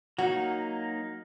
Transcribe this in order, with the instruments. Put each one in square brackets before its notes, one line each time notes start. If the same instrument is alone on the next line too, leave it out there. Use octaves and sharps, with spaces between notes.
[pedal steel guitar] F#3 A#3 D#4 [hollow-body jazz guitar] F#4